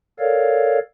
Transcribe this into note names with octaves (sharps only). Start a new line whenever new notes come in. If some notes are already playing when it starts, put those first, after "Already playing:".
A4 A#4 C#5 D5 F5